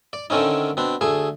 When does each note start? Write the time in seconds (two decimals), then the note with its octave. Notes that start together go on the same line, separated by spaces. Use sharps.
0.13 D5
0.30 D3 D#3 A3 C4 C#4 D#4
0.77 B2 C4 D4
1.01 D2 A3 G#4